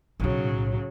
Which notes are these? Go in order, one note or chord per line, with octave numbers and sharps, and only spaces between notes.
B1 A2 C#3 F#3